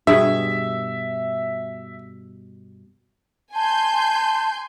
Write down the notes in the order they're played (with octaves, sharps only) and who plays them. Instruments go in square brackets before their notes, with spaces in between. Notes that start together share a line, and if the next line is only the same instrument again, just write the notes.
[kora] G2 B2 G#4 [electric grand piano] E5
[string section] G#5 C6 G6 [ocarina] A5